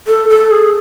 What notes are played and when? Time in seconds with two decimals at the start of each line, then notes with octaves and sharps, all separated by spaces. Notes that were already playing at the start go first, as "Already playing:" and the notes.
0.08 A4
0.29 A4
0.51 G#4